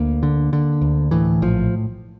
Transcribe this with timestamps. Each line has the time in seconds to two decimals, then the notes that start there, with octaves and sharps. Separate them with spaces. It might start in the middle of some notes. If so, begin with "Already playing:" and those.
Already playing: D2 A#3
0.23 D3
0.53 D3
0.81 D2
1.11 A2 E3
1.42 A#1 F3